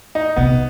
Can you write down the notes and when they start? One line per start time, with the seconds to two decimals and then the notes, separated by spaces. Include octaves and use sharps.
0.15 D#4
0.36 C3 B3